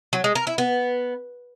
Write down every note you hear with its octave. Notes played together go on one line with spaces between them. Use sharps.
F#3
G#3
A#4
E4
B3